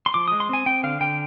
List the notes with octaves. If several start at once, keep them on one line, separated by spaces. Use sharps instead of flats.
C6
F3 D6
G#3 D#6
C6
C4 G#5
C4 G5
D3 F5
D3 G5